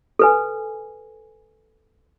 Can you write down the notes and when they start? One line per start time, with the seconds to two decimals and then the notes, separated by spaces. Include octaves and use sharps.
0.19 A4 B4 G#5